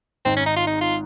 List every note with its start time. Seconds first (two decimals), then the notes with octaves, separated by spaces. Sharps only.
0.25 G#1 G#2 C4
0.36 C#4
0.46 D#4
0.57 F4
0.67 D#4
0.81 F4